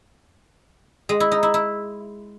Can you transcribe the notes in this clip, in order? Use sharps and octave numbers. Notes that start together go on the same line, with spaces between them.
G#3
E4
D#4
E4
E4